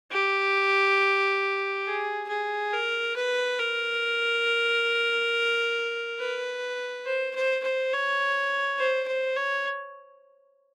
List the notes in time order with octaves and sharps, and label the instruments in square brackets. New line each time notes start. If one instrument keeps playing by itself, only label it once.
[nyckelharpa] G4
G#4
G#4
A#4
B4
A#4
B4
C5
C5
C5
C#5
C5
C5
C#5